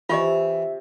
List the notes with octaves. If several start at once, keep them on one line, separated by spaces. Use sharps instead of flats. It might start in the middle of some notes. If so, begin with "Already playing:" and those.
C3 E3 F4 G4 D#5 E5